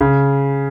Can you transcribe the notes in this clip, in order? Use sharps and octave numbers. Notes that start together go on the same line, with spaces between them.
C#3